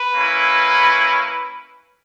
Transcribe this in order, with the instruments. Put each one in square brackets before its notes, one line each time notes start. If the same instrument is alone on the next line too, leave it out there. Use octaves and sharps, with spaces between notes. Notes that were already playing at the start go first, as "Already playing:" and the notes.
Already playing: [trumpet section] B4
A#3 C#4 E4